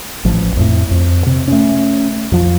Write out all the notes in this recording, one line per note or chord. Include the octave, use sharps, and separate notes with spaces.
A1 F3
F2 A2
F2
C3
A3 C#4
F2 F3